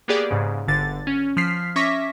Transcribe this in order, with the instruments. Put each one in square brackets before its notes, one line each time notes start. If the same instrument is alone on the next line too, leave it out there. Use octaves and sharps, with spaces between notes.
[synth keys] A#3 B3 G4 G#4 D5
G#2 C#3
G1 D3 A6
C#4
F3 F6 B6 C7
C#4 E5 C#6 D6 A#6 B6